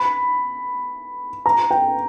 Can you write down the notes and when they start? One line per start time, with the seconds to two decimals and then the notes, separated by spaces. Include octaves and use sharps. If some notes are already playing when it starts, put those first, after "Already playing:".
Already playing: B5
1.46 A#5
1.71 G5